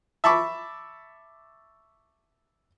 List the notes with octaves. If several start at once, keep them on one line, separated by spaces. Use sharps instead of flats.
E5 A5 B5 C#6 D6